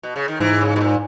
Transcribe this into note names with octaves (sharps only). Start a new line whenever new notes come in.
B2
C#3
D#3
G#2 E3
C#3
B2
A#2